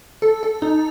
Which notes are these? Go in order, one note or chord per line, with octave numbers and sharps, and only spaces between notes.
A4
A4
D#4